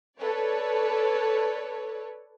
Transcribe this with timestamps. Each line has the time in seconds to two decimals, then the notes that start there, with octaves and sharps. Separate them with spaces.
0.18 A4 B4 C#5 D5